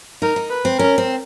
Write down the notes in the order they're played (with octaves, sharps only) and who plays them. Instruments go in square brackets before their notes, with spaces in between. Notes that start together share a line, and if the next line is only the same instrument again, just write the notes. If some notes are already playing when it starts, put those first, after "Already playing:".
[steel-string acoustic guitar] D#4 [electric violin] A#4
[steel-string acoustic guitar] D#4
[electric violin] B4
[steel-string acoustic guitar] C4
[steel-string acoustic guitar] C#4 [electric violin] A#4
[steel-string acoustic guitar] C4